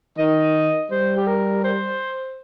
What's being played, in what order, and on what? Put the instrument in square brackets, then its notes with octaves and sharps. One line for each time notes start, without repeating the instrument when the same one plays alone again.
[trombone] D#3 [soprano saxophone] D#5
[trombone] G3 [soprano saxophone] C5
[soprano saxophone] G4
A#4
C5